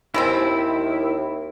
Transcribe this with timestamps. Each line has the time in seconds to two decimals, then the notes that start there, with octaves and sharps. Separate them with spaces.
0.14 D#2 D#3 G#3 C4 E4